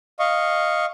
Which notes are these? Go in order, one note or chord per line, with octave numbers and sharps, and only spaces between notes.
D#5 F5 C#6